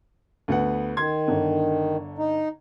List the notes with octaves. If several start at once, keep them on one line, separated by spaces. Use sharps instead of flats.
D2 B3 F#5
D#3 C6 G#6
G1 D3
D#4